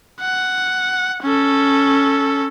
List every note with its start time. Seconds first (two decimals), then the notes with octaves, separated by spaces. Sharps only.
0.21 F#5
1.22 C#4 A4